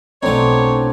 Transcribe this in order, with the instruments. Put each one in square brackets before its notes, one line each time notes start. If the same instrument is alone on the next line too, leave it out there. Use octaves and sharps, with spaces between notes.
[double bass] B1 [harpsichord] A2 F#3 [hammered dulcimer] C4 D4 D#4 [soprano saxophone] C#5